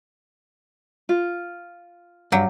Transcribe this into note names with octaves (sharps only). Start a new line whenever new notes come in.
F4
G2 F#3 G4